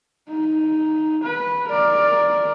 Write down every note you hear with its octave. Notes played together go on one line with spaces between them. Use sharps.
D#4
B4
A#4 D5